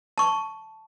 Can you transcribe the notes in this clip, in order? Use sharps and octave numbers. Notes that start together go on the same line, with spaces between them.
A5 C#6